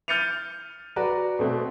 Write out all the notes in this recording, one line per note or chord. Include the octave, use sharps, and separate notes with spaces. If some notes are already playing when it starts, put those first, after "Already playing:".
F6 G6 A6 C#7 D#7 F7
F#4 B4 D5 A#5 B5
B2 A3 C4